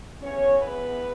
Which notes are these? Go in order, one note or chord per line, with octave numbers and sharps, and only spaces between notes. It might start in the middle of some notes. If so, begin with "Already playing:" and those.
E2 E3 C#4 C#5
B3 B4